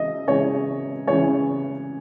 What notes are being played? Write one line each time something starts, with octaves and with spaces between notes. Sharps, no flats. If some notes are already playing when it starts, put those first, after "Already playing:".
Already playing: C#3 E3 G#3 D#5 E5
C#3 E3 G#3 C#5
C#3 E3 G#3 C#5